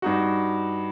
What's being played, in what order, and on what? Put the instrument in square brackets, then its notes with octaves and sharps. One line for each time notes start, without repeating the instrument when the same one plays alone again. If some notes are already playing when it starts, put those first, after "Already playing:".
[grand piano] G2 D#4 F#4